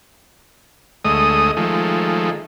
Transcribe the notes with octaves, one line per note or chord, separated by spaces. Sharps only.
D2 G#3 A3 D#5 D#6
D#3 F3 G#3 A3